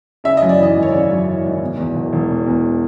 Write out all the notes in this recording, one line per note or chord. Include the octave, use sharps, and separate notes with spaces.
C#3 E5
D#5
F#2
D5
E3 D#5
G#1
C#5
C#3 D5
F#2
E3
G#1
B2
E2
E1
E1
B2
E2